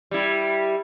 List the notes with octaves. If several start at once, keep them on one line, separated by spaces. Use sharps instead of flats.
G3 E4